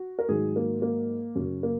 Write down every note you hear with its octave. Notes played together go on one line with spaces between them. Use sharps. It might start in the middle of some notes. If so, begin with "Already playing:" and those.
Already playing: F#4
A#4
G#2 D#3 F#3 G#4
A#3
A#3
F#2 C#3 F#3 C#4
A#3